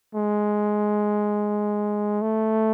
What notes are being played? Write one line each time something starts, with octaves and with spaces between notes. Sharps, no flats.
G#3
A3